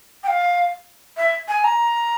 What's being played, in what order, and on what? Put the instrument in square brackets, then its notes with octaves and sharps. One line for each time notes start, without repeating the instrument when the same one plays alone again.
[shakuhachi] G5
F5
E5
G#5
A#5